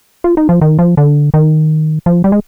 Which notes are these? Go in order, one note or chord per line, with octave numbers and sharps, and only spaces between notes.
F4
D#4
F3
D#3
F3
D3
D#3
F3
G3
G#3